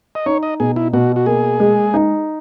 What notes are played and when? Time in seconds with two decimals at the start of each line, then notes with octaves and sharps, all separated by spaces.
0.15 D#5
0.26 D#4 C#5
0.43 D#5
0.60 B2 G#4
0.76 E4
0.93 B2 F#4
1.16 F#4
1.26 A#3 G#4
1.60 G#3
1.94 D#4